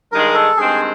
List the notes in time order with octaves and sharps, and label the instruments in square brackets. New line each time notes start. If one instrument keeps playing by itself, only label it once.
[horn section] G2 D#3 G#3 [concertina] A#4
[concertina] A4
[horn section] G2 D#3 G#3 C4 [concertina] G#4